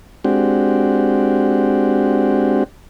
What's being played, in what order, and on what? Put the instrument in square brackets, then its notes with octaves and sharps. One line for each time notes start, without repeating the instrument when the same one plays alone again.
[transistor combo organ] G#3 C4 D4 F#4 G4